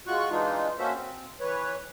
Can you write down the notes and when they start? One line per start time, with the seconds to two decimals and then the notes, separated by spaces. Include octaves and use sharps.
0.07 G#3 F4 F#4 C#6 F#6
0.30 E3 G#3 D4 D#4 F4
0.79 A#3 C#4 F#4 A4 C5 E5
0.94 C4
1.40 E3 B4 C#5